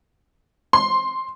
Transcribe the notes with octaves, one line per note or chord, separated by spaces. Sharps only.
C6